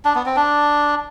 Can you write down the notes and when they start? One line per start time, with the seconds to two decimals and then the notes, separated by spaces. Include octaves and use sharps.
0.05 D4
0.15 B3
0.26 C4
0.36 D4